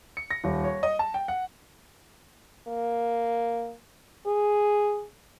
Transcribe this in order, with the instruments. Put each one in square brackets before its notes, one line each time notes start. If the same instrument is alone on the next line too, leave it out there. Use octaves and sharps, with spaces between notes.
[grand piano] C#7
A#6
D#1
C#5
D#5
A5
G5
F#5
[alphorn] A#3
G#4